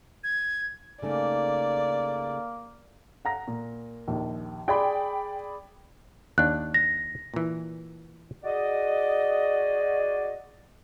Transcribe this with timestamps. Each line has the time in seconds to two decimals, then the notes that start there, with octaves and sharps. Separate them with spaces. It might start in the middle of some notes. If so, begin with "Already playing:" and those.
0.24 G#6
1.02 C#3 A3 A#3 D#4 D5
3.25 F#5 A#5 A#6
3.48 A#2
4.08 A#1 D#2 D#4
4.68 G#4 D5 G5 B5 C6
6.38 D#2 D4 F#6
6.74 A#6
7.34 A#2 E3
8.44 F#4 G#4 D5 D#5